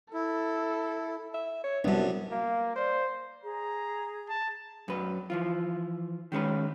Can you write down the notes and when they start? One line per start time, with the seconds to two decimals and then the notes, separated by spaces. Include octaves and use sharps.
0.14 E4 A4
1.34 E5
1.64 C#5
1.84 C2 F#2 G3 B3 D4
2.32 A#3 F5
2.76 C5 D5
3.44 G#4 A#5
4.29 A5
4.88 F#2 B4
5.30 E3 F3 F4
6.32 D#3 G#3 C#4 B4